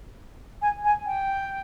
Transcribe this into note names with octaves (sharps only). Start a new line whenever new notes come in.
G#5
G#5
G5